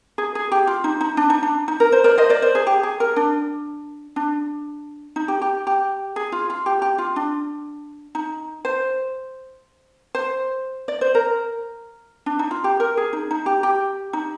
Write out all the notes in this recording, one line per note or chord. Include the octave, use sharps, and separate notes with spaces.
G#4
G#4
G4
F4
D#4
D#4
D4
D#4
D4
D#4
A#4
C5
A#4 D5
C5 D#5
A#4 D5
C5
G#4
G4
G#4
A#4
D4
D4
D#4
G4
G4
G4
G#4
F4
F4
G4
G4
F4
D4
D#4
C5
C5
D5
C5
A#4
D4
D#4
F4
G4
A#4
G#4
D#4
D#4
G4
G4
D#4